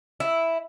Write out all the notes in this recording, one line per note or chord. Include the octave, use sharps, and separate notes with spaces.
E4